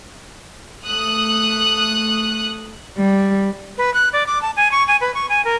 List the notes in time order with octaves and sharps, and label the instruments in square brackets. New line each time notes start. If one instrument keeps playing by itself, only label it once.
[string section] A3 D#6 F#6
[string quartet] G3
[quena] B4
F#6
D5
D6
A5
G#5
C#6
G#5
B4
C#6
G#5
A#4